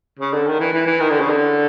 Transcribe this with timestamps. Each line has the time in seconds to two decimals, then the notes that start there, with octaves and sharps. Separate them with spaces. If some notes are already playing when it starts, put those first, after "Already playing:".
0.19 C#3
0.34 D3
0.47 D#3
0.59 E3
0.73 E3
0.87 E3
1.00 D#3
1.10 D3
1.20 C#3
1.29 D3